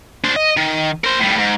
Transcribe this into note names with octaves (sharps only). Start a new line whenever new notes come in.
D4 C5
D#5
D#3
A#4 C5
A2 G3
G#2